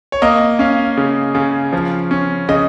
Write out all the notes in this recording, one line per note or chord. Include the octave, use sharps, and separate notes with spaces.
C#5
A#3 D#5
C#4 F5
C#3
C#3
F3
C#4
C#3 D#5